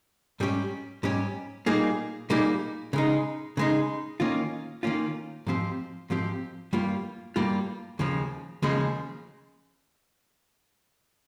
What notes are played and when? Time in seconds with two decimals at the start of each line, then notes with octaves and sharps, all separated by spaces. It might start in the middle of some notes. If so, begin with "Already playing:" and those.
0.40 G#2 G3 C#4 G4
1.03 G#2 G3 C#4 G4
1.66 A#2 G3 A#3 D#4 G#4
2.30 A#2 G3 A#3 D#4 G#4
2.93 C#3 G#3 D#4
3.57 C#3 G#3 D#4
4.20 D#3 A#3 C#4 F4
4.83 D#3 A#3 C#4 F4
5.47 G#2 F3 C4 G4
6.10 G#2 F3 C4 G4
6.73 G2 G3 A#3 F4
7.36 G2 G3 A#3 F4
7.99 D#2 C#3 F3 G#3
8.63 D#2 C#3 F3 G#3